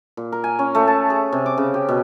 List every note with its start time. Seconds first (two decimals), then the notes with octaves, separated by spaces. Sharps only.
0.17 A#2
0.32 A#4
0.44 G#5
0.59 C#4
0.75 A3
0.88 A5
1.10 G#4
1.32 C3
1.46 D6
1.58 C#3
1.74 G4
1.89 B2